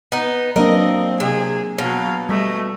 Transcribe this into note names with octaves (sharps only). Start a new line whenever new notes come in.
B3 D#4
F#3 A#3 C4 D4 A#4 D#5
C3 G#4
B2 F#3 F5
G3 A3 D#5